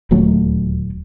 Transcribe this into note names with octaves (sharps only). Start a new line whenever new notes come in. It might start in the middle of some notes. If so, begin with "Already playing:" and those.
D#1 D2 F#3 A3